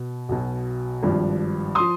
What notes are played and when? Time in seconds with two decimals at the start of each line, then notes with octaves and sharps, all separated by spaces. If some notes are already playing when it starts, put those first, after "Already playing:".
Already playing: B2
0.29 B1 B2
1.03 G#1 G2 F3
1.75 F3 C6 D#6